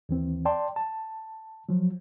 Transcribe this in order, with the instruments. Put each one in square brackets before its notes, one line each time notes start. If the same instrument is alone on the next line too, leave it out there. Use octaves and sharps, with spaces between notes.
[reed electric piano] D#2 E3 C4
D5 G5 A5 C6
A5
F3 F#3